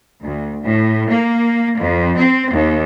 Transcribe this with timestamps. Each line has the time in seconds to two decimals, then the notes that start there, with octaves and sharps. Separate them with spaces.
0.21 D2
0.62 A2
1.08 A#3
1.78 F2
2.17 C4
2.51 D#2